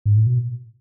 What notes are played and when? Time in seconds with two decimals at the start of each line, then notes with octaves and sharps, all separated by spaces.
0.06 G#2
0.16 A2
0.27 B2